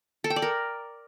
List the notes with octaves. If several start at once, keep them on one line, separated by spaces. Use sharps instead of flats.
A4
G5
D5
A#4